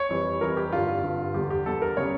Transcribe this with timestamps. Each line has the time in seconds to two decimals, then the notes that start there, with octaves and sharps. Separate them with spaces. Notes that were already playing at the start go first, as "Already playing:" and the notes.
Already playing: C#5
0.09 F2 E3 G3
0.41 F2 E3 G3 A#4
0.57 G4
0.72 G2 D3 G3 F4
1.03 G2 D3 G3
1.34 E2 D3 G3 G4
1.50 G4
1.66 E2 D3 G3 A4
1.82 A#4
1.97 C#3 G3 C#5